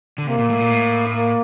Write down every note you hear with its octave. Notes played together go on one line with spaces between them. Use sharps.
D3
C3 A#3
A#2
A2
A#2
A2
A#3